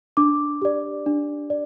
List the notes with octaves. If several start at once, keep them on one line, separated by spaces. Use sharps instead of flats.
D4 D6
G4 D5
D4
D5